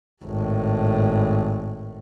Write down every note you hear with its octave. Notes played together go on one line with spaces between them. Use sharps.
G#1 A2